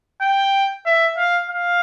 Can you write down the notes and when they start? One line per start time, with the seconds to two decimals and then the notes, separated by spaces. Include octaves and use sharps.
0.21 G5
0.86 E5
1.17 F5
1.50 F5